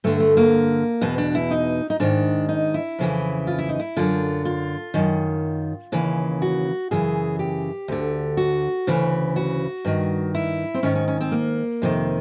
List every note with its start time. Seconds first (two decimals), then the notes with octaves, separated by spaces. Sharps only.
0.04 G2 D3 A3
0.20 A3
0.37 A#3
1.01 E2 B2 B3
1.18 D4
1.35 E4
1.51 D#4
1.90 D#4
2.00 G#2 D#3 D4
2.49 D#4
2.74 E4
2.99 F2 C#3 E3
3.47 F4
3.58 E4
3.69 D#4
3.80 E4
3.97 F#2 D3 F4
4.45 F4
4.94 F#2 D#3
5.92 D#2 C#3 E3
6.42 F#4
6.91 F#2 C#3 E3 G#4
7.39 G4
7.88 D2 D3
8.37 F#4
8.87 D2 C#3 E3
9.36 F#4
9.85 G2 D#3
10.35 E4
10.74 C4
10.83 G#2 D#3 C#4
10.95 C#4
11.08 C#4
11.21 C4
11.32 A#3
11.82 F2 C3 D#3